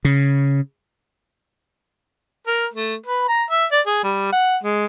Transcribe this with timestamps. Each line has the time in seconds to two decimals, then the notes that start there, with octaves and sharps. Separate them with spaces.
0.05 C#3
2.47 A#4
2.73 A3
3.06 B4
3.28 A#5
3.51 E5
3.72 D5
3.86 G#4
4.03 G3
4.33 F#5
4.64 G#3